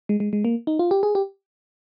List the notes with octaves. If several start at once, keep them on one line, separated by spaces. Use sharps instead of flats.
G#3
G#3
G#3
A#3
D#4
F4
G4
G#4
G4